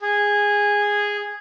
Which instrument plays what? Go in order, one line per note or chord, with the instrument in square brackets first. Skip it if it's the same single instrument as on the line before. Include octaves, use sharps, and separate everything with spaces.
[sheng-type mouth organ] G#4